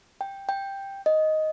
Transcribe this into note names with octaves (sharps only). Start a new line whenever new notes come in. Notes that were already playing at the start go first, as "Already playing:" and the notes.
G5
G5
D#5